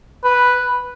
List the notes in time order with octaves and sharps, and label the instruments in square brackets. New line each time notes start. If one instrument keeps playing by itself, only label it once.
[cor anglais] B4